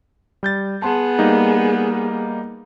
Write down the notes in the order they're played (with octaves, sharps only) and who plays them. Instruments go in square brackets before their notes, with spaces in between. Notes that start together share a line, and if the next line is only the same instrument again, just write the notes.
[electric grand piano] G3 G6 A6
[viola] B3 G#4 [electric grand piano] A5 C6
[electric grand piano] G3 A#3 D#4